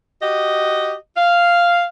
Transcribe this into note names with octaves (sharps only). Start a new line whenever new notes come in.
F#4 G4 D#5
F5